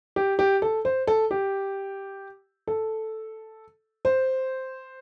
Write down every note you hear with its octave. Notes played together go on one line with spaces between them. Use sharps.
G4
G4
A4
C5
A4
G4
A4
C5